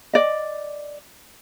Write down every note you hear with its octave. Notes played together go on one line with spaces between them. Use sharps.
D5 D#5